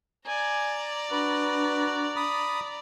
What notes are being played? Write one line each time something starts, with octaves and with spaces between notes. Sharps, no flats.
D5 G#5 A#5
D4 F#4 B4
B5 D#6